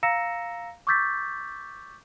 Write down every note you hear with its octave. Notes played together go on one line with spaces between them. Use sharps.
F5 A#5 E6 A#6 C#7 E7
C#6 D6 E6 G6 A6 B6